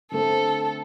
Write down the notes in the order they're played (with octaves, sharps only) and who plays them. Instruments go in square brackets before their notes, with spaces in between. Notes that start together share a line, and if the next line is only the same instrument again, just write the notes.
[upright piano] D3 A3 C4 [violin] A4